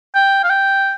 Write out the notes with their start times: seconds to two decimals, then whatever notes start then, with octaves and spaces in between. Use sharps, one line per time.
0.15 G5
0.44 F5
0.50 G5